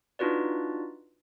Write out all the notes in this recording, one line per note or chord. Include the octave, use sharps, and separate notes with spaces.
D4 D#4 F4 F#4 B4 D5